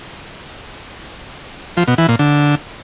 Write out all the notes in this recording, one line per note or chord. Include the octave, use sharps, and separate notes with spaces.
F3
B2
E3
A#2
D3